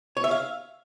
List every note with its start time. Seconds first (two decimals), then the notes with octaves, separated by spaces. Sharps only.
0.17 C#5
0.24 E5
0.31 F5